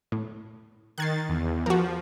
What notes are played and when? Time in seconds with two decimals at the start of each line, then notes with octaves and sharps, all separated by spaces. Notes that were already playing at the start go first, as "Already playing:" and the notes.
0.12 A2
0.98 D#3 F#6 G#6 A6 C7
1.29 E2
1.66 F3 F#4 A#4